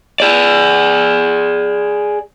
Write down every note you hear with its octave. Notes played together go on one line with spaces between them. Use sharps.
G#4 D5